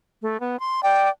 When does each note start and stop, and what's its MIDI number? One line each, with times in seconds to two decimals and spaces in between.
0.22 0.40 57
0.40 0.59 59
0.60 0.80 84
0.83 1.09 74
0.83 1.09 79